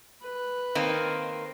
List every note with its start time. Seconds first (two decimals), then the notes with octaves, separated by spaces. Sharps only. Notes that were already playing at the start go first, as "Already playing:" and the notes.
0.22 B4
0.75 D#3 A#3 C4